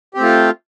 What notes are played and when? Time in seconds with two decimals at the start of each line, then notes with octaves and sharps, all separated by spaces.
0.14 G4
0.17 C4
0.20 A3
0.23 F4